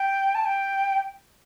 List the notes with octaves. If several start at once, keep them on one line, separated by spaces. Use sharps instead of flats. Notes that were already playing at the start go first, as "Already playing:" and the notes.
Already playing: G5
A5
G5